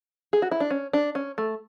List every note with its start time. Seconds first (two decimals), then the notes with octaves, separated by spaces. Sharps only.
0.33 G#4
0.42 F#4
0.51 E4
0.60 D4
0.71 C#4
0.93 D4
1.15 C#4
1.38 A3